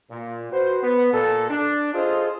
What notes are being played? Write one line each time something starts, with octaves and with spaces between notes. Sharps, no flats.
A#2
F#4 B4 C5
B3
A#2 A4
D4
F4 G#4 A4 C5 D#5